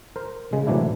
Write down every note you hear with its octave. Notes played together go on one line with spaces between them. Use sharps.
A#4 C5
C#3 G#3
A2 C3 E3 F#3 D4 E4